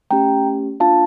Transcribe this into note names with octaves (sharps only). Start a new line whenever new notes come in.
A3 C#4 G4 G5 A#5
A#3 D4 F4 F5 A5